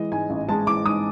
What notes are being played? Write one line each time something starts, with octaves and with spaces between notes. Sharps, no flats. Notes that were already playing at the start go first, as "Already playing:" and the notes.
Already playing: E3 G#3 D#5
G#2 G#5
A1
G#3 A5
E3 D6
G#2 D#6